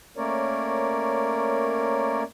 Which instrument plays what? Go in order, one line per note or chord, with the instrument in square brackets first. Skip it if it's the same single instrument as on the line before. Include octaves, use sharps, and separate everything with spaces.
[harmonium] A3 A#3 C#4 A#4 C#5 D5